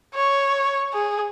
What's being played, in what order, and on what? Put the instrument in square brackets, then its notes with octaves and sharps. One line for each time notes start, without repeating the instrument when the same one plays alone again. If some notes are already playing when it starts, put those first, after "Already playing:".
[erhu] C#5
G#4